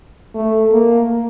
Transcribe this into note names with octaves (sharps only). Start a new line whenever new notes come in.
A3
A#3